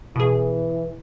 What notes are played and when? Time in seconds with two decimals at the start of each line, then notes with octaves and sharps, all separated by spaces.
0.16 B2 E3 G#4